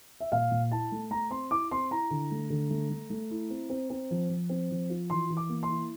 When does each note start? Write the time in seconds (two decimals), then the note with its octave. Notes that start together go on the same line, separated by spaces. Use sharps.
0.20 E5
0.32 A#2 F5
0.51 A#2
0.71 E4 A5
0.92 A3
1.11 A3 A#5
1.30 C4 C6
1.50 E4 D6
1.71 C4 C6
1.91 E4 A#5
2.11 D3
2.31 A3
2.50 D3
2.70 A3
2.90 A3
3.10 A3
3.31 E4
3.50 C4
3.70 C4
3.90 C4
4.11 F3
4.30 F3
4.49 C4
4.71 F3
4.90 F4
5.10 E3 C6
5.30 E3
5.37 D6
5.49 A#3
5.63 C6
5.69 E4